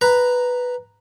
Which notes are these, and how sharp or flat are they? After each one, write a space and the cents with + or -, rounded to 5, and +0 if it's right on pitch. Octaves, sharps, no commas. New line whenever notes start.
B4 +0 A#5 +0